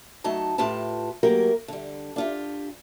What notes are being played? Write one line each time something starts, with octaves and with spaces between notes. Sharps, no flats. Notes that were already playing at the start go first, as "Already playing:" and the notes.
F#3 A3 D#4 A5
A2 F4 G4 B4 A5
F#3 A3 A#3 G4 A#4
D3 G3
D4 F4 G4